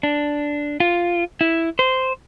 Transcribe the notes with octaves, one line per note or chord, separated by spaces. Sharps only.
D4
F4
E4
C5